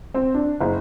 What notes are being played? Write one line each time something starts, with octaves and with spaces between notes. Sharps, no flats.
C4
D4
F#1